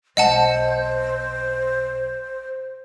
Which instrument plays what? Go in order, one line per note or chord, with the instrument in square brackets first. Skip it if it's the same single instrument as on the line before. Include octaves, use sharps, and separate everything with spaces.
[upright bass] B1 [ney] C5 [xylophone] D#5 F#5 A5